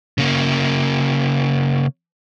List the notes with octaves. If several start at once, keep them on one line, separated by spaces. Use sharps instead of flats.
C#3 A#3